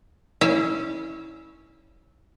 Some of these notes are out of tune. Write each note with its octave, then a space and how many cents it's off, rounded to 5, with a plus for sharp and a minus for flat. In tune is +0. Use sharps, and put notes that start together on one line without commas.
C#4 +0 E4 -20 F5 -45